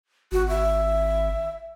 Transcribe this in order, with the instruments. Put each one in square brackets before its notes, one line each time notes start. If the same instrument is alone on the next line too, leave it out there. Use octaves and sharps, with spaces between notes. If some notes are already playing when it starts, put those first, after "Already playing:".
[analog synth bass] G#1 [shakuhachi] F#4
[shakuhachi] E5